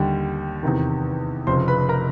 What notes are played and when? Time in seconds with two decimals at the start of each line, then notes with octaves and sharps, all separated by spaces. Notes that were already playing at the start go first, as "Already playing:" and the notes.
Already playing: D#2 D3 G3
0.63 E2 C3 D#3
1.47 F1 F2 C#3 C5 C6
1.68 B4 B5
1.89 A#4 A#5